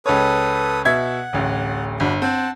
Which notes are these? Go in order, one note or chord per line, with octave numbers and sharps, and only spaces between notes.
C#2 A4 B4 C#5 D#6
B2 E5 F#5 G#6
D1 A1
G1 D4 F#4 B5
C4 F#5 A5